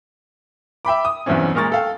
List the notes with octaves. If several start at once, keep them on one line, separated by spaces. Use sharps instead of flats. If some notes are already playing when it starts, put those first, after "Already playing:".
E5 G5 B5 D6
D#6
B1 E2 G2 E3 C4 C#4
A#2 G#3 A#4 C#6 A6
A4 F5 G5